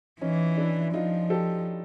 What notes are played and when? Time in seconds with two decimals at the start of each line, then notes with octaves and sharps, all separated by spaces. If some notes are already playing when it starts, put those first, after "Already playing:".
0.21 E3 C#4 D#4
0.58 D4 E4
0.94 F3 D#4 F4
1.30 G4 A4